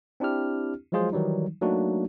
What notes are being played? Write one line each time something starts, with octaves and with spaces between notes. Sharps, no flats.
C4 D4 E4 G4 F6
F3 F#3 G#3 F4 G#4 C5
D#3 E3 F#3 G3 D#4
F#3 A3 A#3 D4 D#4 F#4